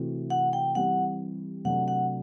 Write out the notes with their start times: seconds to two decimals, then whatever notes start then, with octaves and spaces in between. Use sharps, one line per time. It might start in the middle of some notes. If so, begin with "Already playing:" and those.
Already playing: C3 E3 A3 C4 F#4
0.30 F#5
0.53 G5
0.75 E3 G3 C4 G4 F#5
1.65 C3 F#3 A3 D4 F#4 F#5
1.88 F#5